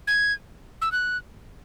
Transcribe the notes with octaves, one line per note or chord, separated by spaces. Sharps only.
G#6
E6
F#6